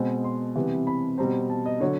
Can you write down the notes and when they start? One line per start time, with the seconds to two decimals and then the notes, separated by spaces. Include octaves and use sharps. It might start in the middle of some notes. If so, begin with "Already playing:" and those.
Already playing: B2 G#3 C4
0.24 C6
0.56 C3 E3 G3 B3
0.87 B5
1.18 B2 G3 C4 A#5
1.50 A5
1.66 D#5
1.80 D3 F#3 C#5